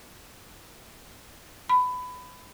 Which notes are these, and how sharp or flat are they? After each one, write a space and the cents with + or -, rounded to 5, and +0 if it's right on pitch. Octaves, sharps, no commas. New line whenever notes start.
B5 +20